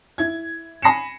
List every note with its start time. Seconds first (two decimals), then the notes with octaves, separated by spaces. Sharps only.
0.18 E4 G#6
0.82 G#5 B5 A#6 C7 C#7 E7